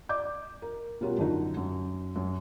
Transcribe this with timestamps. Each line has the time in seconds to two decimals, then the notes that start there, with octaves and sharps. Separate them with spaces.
0.09 D5 D#5 D6 G6
0.62 A#4
1.01 B2 G3 C#4 F4 F#4 A#4
1.18 F#2 D3 F3 D#4 F#4
1.57 F#2
2.16 F#2